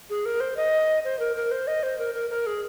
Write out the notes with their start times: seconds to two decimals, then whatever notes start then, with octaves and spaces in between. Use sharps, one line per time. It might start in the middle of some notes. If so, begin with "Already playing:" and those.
0.10 G#4
0.25 A#4
0.40 C5
0.57 D#5
1.04 C5
1.20 A#4
1.36 A#4
1.51 C5
1.67 D#5
1.83 C5
1.99 A#4
2.14 A#4
2.30 A#4
2.47 G#4